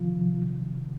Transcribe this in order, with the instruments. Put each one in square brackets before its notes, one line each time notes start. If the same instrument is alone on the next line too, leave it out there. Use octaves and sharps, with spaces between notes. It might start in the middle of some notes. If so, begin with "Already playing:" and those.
Already playing: [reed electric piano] C2 C3 D#3 F3 F4